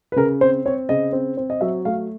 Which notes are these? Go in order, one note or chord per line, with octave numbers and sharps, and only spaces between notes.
B4
C#3 A#4
C4 C5
C4 C#5
C#3 D#5
C4
C4
D#5
F#3 E5
A3 F5